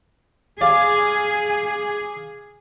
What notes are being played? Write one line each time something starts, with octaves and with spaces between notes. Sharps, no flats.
G#4 D5 F5